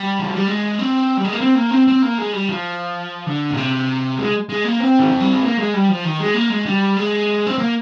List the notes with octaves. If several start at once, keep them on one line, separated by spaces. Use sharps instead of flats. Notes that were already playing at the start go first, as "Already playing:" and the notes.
Already playing: G3
F3
G3
G#3
C4
G3
G#3
A#3
C4
A#3
C4
C4
A#3
G#3
G3
F3
D3
A#2
C3
G#3
G#3
A#3
C4
D#3
F3
G3
G#3
A#3
G#3
G3
F3
D#3
G#3
A#3
G#3
G3
G#3
C4
A#3